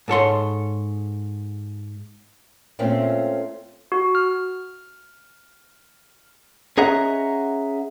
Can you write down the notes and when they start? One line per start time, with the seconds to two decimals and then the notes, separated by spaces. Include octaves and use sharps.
0.08 G#2 A4 C#5 C6
2.79 A#2 A3 C4 C#4 F4
3.92 F#4
4.15 F6
6.78 C#4 G#4 D#5 E5 F#5 A#5